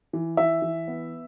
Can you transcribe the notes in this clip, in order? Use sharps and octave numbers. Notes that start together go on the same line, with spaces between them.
E3
E3 E5
E3
B3